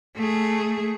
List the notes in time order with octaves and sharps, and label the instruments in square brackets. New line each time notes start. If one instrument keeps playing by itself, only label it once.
[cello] A3 G#4